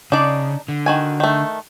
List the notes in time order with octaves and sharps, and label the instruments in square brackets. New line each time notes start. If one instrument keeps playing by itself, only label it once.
[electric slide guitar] C#3 [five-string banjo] D4 D#4 D5
[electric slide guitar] D3
[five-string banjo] D#3 F#4 G#5
D#3 A3